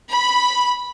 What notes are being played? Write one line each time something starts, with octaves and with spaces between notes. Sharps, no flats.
B5